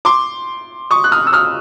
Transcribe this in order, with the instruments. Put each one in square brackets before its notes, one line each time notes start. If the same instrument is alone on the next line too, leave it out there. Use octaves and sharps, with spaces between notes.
[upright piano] C6 D6
C#6 D#6
F#6
D#6 F6
E6
D#6 F6